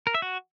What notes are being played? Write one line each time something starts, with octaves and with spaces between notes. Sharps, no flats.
A#4
E5
F#4